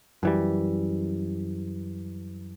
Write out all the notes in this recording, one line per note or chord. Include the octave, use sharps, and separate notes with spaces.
F#2 E3 G3